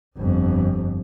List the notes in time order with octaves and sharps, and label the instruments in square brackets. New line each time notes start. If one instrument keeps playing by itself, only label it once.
[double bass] G1 F2